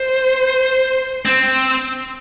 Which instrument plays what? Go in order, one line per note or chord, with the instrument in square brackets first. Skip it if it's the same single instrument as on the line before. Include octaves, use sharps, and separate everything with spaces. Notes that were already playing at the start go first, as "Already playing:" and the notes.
Already playing: [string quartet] C5
[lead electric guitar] C4